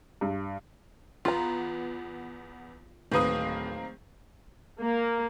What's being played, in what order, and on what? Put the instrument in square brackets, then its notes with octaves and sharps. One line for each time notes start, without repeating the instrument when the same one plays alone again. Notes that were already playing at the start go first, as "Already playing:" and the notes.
[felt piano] G2
[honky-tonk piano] E2 B3 [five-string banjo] F4 A#5
[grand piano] D1 B4 D#6 [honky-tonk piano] D#3 A#3 C4
[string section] A#3